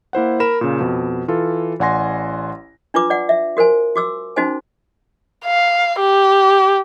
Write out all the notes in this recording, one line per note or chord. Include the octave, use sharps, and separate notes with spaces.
A#3 E4 C5 F#5
A#4 B5 E7
A#2 C#3
F2 B2
E3 F4 A4
A1 D5 F#5 G#5 C6 A#6
D4 F4 B4 D6
D5 F#5
E5
F#4 A#4 C5 G#5
F#4 D6 E6
C#4 D#4 F#4 C5 G#5
F5
G4